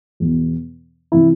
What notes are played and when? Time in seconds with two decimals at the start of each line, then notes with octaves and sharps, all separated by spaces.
0.20 E2 B2
1.12 C3 E3 E4